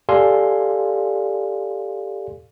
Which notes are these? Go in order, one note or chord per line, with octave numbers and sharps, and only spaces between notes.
G4 A4 D5 F5 G#5 C6